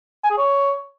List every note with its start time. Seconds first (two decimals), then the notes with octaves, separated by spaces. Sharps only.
0.24 G#5
0.31 G#4
0.37 C#5